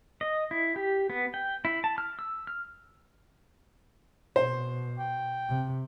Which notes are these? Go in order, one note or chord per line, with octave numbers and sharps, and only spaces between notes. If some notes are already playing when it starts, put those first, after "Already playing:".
D#5
E4
G4
B3
G5
E4
A5
F6
E6
F6
B2 C5
G5
C3